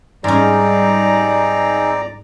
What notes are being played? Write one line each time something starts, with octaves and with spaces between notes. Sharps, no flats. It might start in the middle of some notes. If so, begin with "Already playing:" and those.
G#2 G3 C4 C#4 D#4 G#4 D5 A#5